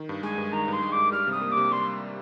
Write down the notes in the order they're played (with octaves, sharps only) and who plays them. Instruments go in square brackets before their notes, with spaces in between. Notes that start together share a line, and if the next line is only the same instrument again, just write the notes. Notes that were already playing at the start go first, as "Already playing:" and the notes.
Already playing: [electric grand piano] D#3
G2
[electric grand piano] G#3 [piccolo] G#5
[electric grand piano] G2
[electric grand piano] D#3 [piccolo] A#5
[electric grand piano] G2 [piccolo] C6
[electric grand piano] G#3
[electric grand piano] G2 [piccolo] D6
[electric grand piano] G3 [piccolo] F6
[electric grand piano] C3 [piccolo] D#6
[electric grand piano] A#3
[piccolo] D6
[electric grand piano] C3
[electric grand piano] G3 [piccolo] C6